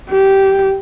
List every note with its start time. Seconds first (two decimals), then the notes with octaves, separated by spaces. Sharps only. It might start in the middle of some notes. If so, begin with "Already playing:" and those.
0.11 G4